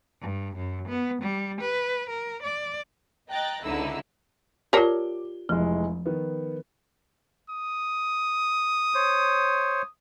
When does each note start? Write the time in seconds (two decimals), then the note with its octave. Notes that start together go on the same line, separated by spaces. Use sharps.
0.21 G2
0.56 F#2
0.88 B3
1.21 G3
1.60 B4
2.09 A#4
2.42 D5
3.30 D#5 G5 A#5 F#6 A6
3.64 C#2 D3 D#4 E4 E6
4.73 F4 G4 A#4 C#5 D5 A5 D6 G7
5.49 F1 E3 F3 G#3
6.06 D#3 B3
7.50 D#6
8.94 C5 C#5